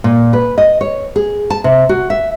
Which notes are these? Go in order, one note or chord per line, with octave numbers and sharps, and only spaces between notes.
A#2
B4
D#5
C#5
G#4
A5
C3
F#4
E5